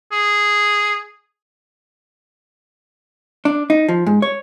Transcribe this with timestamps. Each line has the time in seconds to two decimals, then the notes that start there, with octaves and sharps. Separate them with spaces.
0.12 G#4
3.45 D4
3.70 D#4
3.89 F3
4.07 G#2
4.22 C#5